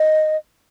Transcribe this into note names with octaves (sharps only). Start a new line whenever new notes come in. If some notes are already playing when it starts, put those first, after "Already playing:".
Already playing: D#5